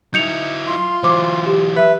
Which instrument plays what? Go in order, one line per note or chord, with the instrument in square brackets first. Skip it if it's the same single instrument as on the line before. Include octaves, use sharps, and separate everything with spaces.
[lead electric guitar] F#3 E4 [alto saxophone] D#4 [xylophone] G6 C#7 F7
[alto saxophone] F4 [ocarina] C6
[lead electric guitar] E3 F#3 [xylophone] C5 D6
[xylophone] G4
[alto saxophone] B4 [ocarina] E5